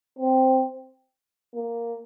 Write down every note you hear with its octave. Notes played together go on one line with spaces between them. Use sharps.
C4
A#3